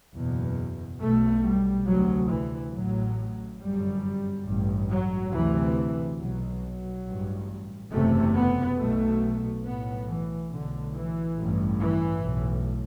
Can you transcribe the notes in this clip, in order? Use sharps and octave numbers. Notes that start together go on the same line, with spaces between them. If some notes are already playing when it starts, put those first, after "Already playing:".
F#1 E2 B2
B1 B2 A3
G3
D2 C3 F#3
E3
A1 A2 F#3
G1 F#2 G3
A1 G2
F#3
D2 C3 E3
B1 B2 F#3
F#3
A1 G2
F#1 E2 C3 A3
B3
B1 B2 A3
B1 A2 B3
E3
B1 A2 D3
E3
A1 G2
E3
B1 A2